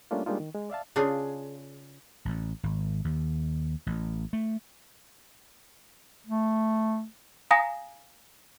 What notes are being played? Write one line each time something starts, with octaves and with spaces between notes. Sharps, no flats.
G3 A3 A#3 C#4 D4 F4
G3 G#3 A#3 D4 D#4 F4
D#3
G#3
D5 E5 F5 A5
C#3 D4 F4 G#4
A1
G#1
D#2
A1
A3
A3
F5 G#5 A#5 D#6 A#6